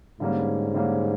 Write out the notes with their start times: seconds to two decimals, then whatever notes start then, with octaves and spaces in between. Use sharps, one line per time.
0.20 G#2 D3 G3 A#3 C#4
0.74 D3 G3 A#3 C#4